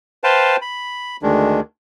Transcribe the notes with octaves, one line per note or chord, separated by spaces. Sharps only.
B4 C5 F5 G5 A5
B5
D2 D#3 G#3 D4